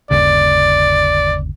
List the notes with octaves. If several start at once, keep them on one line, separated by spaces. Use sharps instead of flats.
G1 D#2 C#3 D5